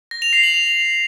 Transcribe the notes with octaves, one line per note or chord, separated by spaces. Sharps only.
A#6
F7
C7
F#7
F7